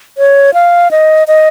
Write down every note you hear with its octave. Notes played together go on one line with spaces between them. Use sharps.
C#5
F5
D#5
D#5